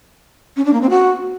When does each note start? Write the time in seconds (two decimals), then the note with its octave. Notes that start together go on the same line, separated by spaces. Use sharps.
0.57 C#4
0.65 D4
0.73 A#3
0.82 C4
0.90 F#4